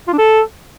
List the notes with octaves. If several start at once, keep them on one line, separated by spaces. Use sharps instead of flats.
F4
D4
A4